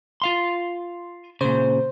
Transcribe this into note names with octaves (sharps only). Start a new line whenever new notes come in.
F4 F5 C6
A#2 C#3 C5